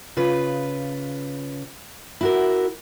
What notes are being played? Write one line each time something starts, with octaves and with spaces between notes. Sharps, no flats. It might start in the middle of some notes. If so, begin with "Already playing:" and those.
C#3 F4 B4
E4 F#4 A#4